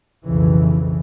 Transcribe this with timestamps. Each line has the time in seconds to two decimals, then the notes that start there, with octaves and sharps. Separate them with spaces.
0.24 B1 F2 C#3 E3